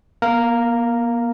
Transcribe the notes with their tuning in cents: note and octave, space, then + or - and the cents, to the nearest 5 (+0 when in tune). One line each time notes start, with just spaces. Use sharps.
A#3 +45 A#4 -5 F5 +0